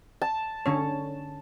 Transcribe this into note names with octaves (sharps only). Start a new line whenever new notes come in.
A5
D3 C#4 C#5